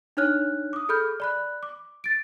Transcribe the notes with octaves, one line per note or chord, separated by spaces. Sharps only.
D4 D#4 C#5 F6 F#6
D6 D#6
G#4 A4 B5 F6 G6
D5 B5 F#6
D6
A6 D7